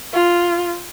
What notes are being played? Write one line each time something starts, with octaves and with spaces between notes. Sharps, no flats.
F4